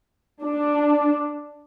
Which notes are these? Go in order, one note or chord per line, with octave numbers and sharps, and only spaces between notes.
D4